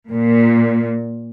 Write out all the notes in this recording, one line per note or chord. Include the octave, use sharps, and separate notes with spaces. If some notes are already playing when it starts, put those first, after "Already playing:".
A#2